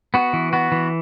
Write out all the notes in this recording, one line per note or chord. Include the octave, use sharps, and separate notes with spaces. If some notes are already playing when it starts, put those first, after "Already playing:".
B3 F#4
E3
B3 F#4
E3